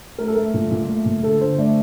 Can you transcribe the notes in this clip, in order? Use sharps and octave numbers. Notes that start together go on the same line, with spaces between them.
A3 A#4
A4
A3 A#4
A#2
A#2
A3
A#2
D3 A4
D3 C5
A3 D5